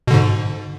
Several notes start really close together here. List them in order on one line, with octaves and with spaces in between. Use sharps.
B2 D3 G#2